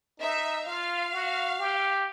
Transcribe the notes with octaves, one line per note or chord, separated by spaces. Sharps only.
D#4 E5
F4 F5
F#4
G4